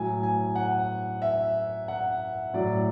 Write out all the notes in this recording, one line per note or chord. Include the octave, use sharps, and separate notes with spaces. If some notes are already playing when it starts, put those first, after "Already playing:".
Already playing: A2 F#3 G#5
G#5
F#5
E5
F#5
A2 F#3 D5